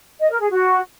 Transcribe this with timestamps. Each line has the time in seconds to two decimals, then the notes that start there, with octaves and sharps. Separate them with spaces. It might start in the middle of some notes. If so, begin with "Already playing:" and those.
0.20 D#5
0.30 A#4
0.40 G#4
0.50 F#4